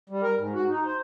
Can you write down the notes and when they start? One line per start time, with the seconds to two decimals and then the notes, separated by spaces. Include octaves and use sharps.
0.10 G3
0.23 A#4
0.38 G#2
0.54 F#4
0.68 D#4
0.85 C5